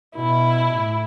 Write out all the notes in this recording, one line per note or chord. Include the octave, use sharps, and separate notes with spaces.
B2 E4
A2